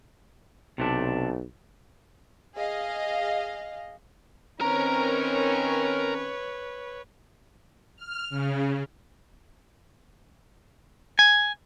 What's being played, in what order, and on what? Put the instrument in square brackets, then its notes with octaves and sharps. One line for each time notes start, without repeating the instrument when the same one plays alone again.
[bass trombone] B1 [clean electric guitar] C3 A3 D4
[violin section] G#4 D#5 F5
[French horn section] D#3 C4 C#4 [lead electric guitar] A#4 A#5 [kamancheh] B4 C#5
[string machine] F6
C#3
[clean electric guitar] G#5